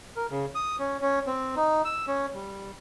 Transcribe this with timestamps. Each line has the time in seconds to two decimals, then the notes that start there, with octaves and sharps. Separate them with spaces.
0.16 A#4
0.31 C#3
0.55 D#6
0.79 C#4
1.01 C#4
1.27 C4
1.56 D#4
1.85 E6
2.07 C#4
2.34 G3